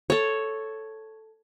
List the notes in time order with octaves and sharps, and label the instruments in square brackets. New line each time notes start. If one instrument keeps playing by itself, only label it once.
[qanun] A4 C#5